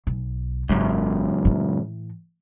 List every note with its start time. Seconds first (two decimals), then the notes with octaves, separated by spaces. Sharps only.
0.07 B1
0.69 G#1 C#2 F#2
1.45 A2 E3